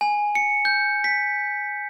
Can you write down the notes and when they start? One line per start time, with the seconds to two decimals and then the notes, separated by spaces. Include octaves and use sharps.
0.01 G#5
0.35 C#7
0.65 G6
1.04 B6